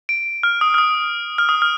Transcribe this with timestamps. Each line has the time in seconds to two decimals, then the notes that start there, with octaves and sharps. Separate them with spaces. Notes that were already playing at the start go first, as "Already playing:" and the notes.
0.09 D7
0.43 F6
0.61 D#6
0.74 F6
0.78 D#6
1.38 F6
1.49 D#6
1.62 F6